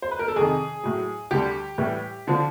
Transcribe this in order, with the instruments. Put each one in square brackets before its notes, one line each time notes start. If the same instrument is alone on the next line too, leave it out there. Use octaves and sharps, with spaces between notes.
[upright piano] C5
B4
A#4
A4
F2 C3 D#3 G#4
A2 F#3
D2 D3 G3 G4
A2 E3 G3
D3 F3